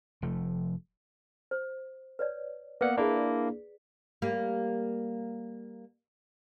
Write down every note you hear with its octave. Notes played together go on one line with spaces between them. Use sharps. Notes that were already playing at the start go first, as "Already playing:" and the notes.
F1 F3 A3
C5
B4 C#5 D5
A#3 B3 B4 D5 F#5
A#3 D4 E4 G4 G#4 D5
G3 A#3